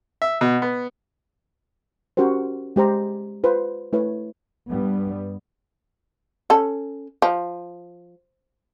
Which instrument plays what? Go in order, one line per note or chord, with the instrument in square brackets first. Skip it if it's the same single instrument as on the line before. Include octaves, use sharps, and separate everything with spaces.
[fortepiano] E5
B2
B3
[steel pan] C#4 F#4 G4 A#4 C5
G#3 G4 C5 A#5
F4 B4 C5
A3 E4 B4 C#5
[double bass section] G2 G3 B3
[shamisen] C#4 A4
F3